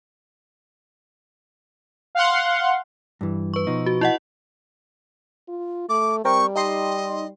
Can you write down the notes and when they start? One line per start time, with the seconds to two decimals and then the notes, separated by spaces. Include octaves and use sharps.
2.15 F5 F#5 C6
3.21 G2 E3
3.54 B4 C#6
3.67 B2 F3 D#4
3.86 F#4
4.01 E4 D#5 F#5
5.48 F4
5.89 A3 D6
6.25 G3 C4 A#4 G5 C#6
6.55 D#4 G4 D#5 C6